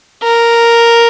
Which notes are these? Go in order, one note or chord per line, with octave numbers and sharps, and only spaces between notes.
A#4